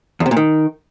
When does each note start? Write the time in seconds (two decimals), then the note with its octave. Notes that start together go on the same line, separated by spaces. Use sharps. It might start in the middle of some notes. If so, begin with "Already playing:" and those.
0.20 E2
0.26 C3
0.31 A#2
0.37 D#3